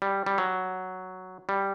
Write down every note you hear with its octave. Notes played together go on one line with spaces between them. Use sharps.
G3
G3
F#3
G3